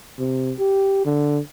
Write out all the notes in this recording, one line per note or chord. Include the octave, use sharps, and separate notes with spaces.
C3
G4
D3